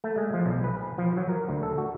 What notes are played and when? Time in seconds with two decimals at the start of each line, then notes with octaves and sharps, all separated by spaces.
0.04 A3
0.18 G#3
0.34 F3
0.46 B1
0.64 B4
0.81 G#5
0.98 F3
1.17 F#3
1.29 A#4
1.48 D2
1.63 A4
1.78 F#4